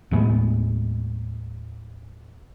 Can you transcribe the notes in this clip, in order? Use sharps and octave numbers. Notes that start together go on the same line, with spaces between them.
D#2 A2 G#3 B3